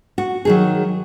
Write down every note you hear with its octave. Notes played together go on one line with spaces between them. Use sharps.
F#4
D#3 F#3 G#4